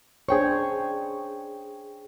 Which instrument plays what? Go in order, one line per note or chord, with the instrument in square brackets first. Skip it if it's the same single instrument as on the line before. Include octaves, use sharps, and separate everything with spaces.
[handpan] D4 C5 C#5 [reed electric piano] G#4 G5 C#6